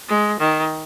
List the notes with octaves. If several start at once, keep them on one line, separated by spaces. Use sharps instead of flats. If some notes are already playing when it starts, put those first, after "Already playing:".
G#3
D#3